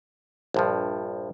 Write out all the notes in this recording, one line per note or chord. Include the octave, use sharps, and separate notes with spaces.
A#1 G2 F3